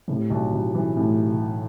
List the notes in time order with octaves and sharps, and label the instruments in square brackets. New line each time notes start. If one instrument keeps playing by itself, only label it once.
[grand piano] A2 [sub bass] C3
[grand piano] B1
B1
E3
A2